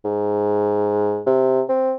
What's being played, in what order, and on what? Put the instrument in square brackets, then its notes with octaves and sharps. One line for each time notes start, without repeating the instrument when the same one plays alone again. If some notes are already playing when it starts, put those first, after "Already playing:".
[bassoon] G#2
C3
C4